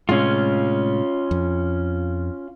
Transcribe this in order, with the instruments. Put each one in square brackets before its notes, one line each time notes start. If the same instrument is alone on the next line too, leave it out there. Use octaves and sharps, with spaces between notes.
[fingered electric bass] A2 C3 G#3 [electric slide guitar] C#4 F4
[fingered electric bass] F2